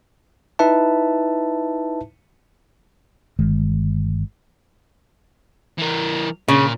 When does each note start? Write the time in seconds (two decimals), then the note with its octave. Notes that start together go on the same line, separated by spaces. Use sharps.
0.59 D#4 E4 B4 E5 A5
3.39 G1 D#3 G#3
5.78 E3 A#4
6.48 A#2 C#3